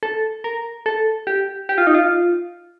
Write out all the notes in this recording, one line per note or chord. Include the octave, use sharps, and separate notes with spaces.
A4
A#4
A4
G4
G4
F4
D#4
F4